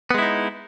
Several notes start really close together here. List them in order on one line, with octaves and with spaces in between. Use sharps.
B3 G#3 E4 D#4